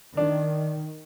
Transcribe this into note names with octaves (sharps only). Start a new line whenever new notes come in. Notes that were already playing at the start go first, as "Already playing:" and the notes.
D#3 D4